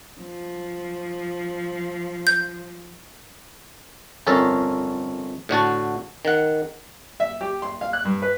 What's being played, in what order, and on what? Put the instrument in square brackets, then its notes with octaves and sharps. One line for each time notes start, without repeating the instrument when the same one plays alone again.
[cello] F3
[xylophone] G6
[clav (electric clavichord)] G1 F2 C#4 A4 A#4 A5
A2 D3 F#4 A5
D#3 F#5
[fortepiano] E5
G4
C6
F5
F#6
G2
B4